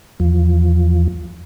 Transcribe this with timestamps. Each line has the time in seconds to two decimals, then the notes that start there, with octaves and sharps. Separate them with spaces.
0.20 E2 F3